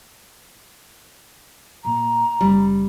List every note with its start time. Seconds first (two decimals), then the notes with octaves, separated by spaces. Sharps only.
1.85 A#2 A#5
2.41 F#1 G3